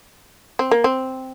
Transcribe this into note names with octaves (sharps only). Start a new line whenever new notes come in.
C4
A#3
C4